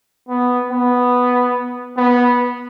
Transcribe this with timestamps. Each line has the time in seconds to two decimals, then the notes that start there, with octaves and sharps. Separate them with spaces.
0.29 B3
0.71 B3
1.98 B3